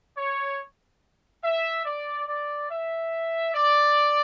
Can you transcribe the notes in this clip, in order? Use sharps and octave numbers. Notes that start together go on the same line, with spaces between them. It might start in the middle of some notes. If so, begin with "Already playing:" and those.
C#5
E5
D5
D5
E5
D5